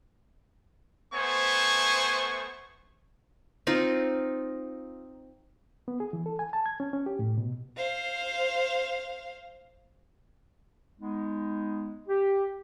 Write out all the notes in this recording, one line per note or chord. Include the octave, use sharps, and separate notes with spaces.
A3 B3 C5 G#5 C#6
C4 D#4 F4
B3
G#4
E3
A4
G#5
A5
G#6
C#4
C#4
G4
A2
B2
C5 F5
G#3 B3 D#4
G4